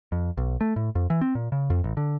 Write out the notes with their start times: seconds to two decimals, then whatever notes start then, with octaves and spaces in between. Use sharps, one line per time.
0.12 F2
0.37 B1
0.61 A3
0.76 A2
0.95 F2
1.10 E3
1.21 C4
1.35 A#2
1.52 C#3
1.70 F2
1.84 A1
1.97 D3